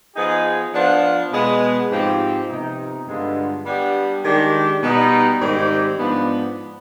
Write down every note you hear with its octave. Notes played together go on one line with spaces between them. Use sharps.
F3 B3 D#4 G#4
F3 B3 D4 F4
B2 G#3 B3
G#2 F3 C4 G4
C3 F3 B3 D#4
G2 D3 G#3 B3 F4
G3 B3 D4 G4
D#3 G#3 D4 G4
B2 G3 B3 D#4
G#2 D#3 G3 C4 G4
G#2 F3 B3 D4